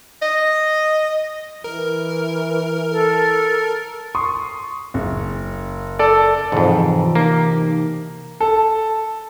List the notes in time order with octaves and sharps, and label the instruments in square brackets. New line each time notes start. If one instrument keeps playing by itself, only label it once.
[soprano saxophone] D#5
[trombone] E3 [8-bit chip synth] A#4
[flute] A4
[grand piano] C6 C#6 D#6
F#1
[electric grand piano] A4 D5
[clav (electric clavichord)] F2 G#2 [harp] C3 E3
[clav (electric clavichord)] A#3 [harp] D#4 G4
[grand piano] A4